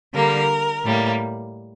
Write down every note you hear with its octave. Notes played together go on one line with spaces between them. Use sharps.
D3 G3 A#3 A#4
A2 G3 A#3